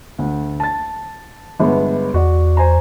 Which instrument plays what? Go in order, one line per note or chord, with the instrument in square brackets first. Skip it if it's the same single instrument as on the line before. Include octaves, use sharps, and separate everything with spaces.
[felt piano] D2
A5 A6
G1 G#3 B3
[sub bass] E2 [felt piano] F#4 D5
[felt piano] C5 G#5 A#5